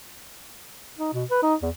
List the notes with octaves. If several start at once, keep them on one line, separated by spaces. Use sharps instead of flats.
D#4
B2
B4
D#4
E2